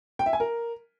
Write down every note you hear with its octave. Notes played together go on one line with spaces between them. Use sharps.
G5
E5
G#5
A#4